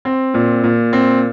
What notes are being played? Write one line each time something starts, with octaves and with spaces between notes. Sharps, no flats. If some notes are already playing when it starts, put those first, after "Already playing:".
C4
A#2
A#2
C4